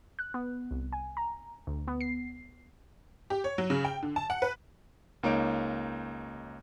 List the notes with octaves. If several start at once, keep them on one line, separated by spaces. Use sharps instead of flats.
F#6
B3
C2
G#5
A#5
D2
B3
C7
G4
C#5
F#3
C#3
G5
D3
A5
F#5
B4
C#2 A#3 D#4 C#5 D7